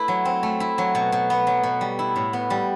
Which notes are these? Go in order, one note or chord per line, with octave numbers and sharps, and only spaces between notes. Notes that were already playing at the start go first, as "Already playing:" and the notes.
Already playing: A3 E4 B4
F#3
C4
A3
E4
F#3
B2
B2
B3
F#3
B2
G3
E4
A2
B3
G3